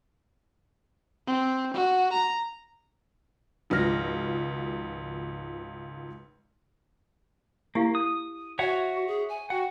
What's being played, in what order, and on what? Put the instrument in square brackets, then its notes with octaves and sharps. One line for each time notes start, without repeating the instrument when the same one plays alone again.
[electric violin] C4
F#4
A#5
[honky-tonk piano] G#1 C#2 F3 F6 A#6
[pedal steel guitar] A#3 [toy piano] E4 G4 F5
[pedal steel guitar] D#6
[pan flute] F#4 [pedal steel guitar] C#5 E5 F#5
[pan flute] G#4
G#5
[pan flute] F#4 [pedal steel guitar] F#5 [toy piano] G5